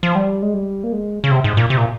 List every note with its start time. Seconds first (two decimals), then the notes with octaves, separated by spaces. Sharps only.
0.03 F3
0.15 G3
0.42 G#3
0.54 G3
0.84 A#3
0.93 G#3
1.24 C#3
1.31 C3
1.44 G#2
1.57 A#2
1.70 C3
1.78 A#2